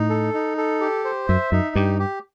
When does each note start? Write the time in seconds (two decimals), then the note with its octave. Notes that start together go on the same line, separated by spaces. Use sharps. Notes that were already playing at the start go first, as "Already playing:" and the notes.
Already playing: A2 D#4
0.10 A4
0.34 D#4
0.57 A4
0.81 G4
1.05 C5
1.28 F#2 E5
1.52 F#2 D#4
1.75 G2 G4
1.99 G4